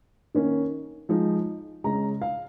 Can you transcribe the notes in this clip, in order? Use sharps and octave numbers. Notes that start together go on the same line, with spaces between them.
D#3 A#3 C#4
F3 G#3 D#4
C#3 G#3 C#4 A#5
F5